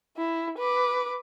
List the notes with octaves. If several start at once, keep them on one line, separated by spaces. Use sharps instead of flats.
E4
B4 D6